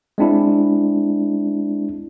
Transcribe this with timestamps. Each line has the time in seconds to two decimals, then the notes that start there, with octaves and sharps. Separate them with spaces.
0.18 G#3 C4 D4 E4